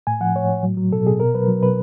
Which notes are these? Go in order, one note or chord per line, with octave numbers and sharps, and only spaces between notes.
A2 G#5
F3 F#5
A2 C#5
A2
F#3
F#3
B2 A4
B2 G#4
B2 A#4
F#3 B4
F#3
B2 B4